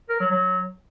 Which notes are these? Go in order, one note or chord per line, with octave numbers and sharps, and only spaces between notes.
A#4
F#3
F#3